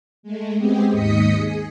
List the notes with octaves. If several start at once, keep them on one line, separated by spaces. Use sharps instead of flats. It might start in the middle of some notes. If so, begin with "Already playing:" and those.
G#3 A3
G#3 B3 C4 G4 G#4
D#2 G#2 D#5 D#6 B6 C#7
G#4